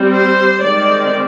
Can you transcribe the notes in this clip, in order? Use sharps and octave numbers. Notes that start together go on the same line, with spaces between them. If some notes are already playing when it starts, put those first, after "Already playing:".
Already playing: G3 C4
C5
D#3 G#3 C4 D5